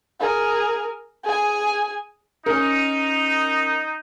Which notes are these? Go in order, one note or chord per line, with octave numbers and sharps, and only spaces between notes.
G#4 A#4
G#4 G#5
C#4 D#4 A#4